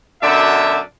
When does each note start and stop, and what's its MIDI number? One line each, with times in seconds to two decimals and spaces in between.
0.22 0.79 42
0.22 0.79 47
0.22 0.79 50
0.22 0.79 62
0.22 0.79 76